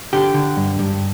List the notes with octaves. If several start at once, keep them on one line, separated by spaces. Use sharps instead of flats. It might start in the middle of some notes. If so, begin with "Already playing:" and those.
D3 G4
D3
G2
G2